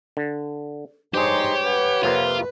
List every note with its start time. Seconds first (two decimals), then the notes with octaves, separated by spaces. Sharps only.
0.17 D3
1.14 G2 D#4 G4 G#4 C5 C#5 C6
1.64 B4 C#5 F#5
2.03 F2 C3 A#3 F4